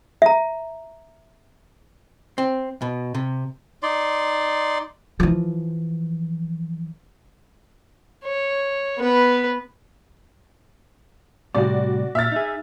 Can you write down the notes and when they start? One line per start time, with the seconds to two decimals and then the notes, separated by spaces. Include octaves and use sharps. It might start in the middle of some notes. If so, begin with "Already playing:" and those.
0.22 E5 A#5
2.38 C4
2.82 B2
3.15 C3
3.83 D#4 D5 C6
5.20 E3 F3
8.24 C#5
8.98 B3 B4
11.55 A2 C3 G3 F#4 D5
12.15 A#2 E5 F6 A6
12.32 D#4 G#4